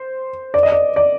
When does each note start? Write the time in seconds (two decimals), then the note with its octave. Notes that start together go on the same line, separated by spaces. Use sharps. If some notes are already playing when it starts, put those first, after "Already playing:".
Already playing: C5
0.54 D5
0.63 D#5
0.72 D5
0.96 D5